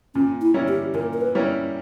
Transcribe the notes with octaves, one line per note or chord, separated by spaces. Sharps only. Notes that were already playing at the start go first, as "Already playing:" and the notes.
A#2 C#4
E4
G3 C#4 E4 A#4
G4
A#2 A#4
A#4
B4
G3 C#4 E4 A#4